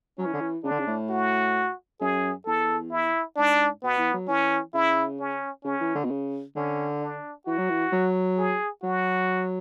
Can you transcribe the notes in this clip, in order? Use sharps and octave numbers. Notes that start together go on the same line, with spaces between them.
F#3 C#4
E3
D3
E3
C#3 D4
D3
C#3
A2
F#4
F#2 G#4
E2 A4
E4
G#2 D4
B2 B3
E3
F#3
E3 C#4
C#3 E4
C#4
C#3 C#4
E3
D3
B2
C#3
D3 C#4
D4
E3 F#4
F#3
E3
F#3
G#4
F#3 F#4